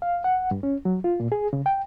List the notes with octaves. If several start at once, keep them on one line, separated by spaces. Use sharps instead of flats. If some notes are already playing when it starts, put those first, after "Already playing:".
F5
F#5
G2
C#4
F#3
F4
A#2
G#4
C#3
G5